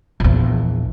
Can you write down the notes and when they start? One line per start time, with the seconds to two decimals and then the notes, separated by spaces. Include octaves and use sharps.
0.20 A#1 E2